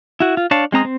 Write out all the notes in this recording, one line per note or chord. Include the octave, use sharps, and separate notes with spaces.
E4 F#4
F4
D4 C#5 F5 A5
G#3 C4 A#5 D#6
C4